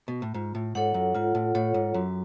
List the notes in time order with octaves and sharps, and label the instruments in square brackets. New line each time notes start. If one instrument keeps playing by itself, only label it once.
[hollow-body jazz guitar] B2
A2
[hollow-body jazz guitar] G#2 [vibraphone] F4
[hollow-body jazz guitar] A2
[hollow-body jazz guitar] G#2 [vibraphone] A4 C#5 F#5
[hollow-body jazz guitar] F#2
[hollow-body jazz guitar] G#2 [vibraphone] F4
[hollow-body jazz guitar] A2
[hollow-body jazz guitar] A2 [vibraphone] A4 C#5 F#5
[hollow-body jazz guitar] G#2
[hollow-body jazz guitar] F#2 [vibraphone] F#3